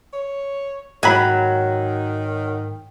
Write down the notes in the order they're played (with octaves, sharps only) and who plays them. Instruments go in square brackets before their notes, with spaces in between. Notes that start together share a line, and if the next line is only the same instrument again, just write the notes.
[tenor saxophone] C#5
[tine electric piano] G#2 G5 [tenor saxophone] D#3 [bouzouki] F#3 [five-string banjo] G#5 B5